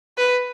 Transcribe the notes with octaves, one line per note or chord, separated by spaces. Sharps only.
B4